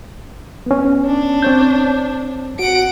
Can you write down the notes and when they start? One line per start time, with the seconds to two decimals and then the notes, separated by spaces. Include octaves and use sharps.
0.66 B3 C#4
1.06 D4
1.42 C4 C#5 G6
2.59 F#4 F#5 D7